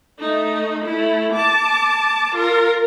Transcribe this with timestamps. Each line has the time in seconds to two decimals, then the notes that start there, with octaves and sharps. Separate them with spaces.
0.19 A3 D#4
0.85 A3 E4
1.33 A5 D6
2.35 F4 A#4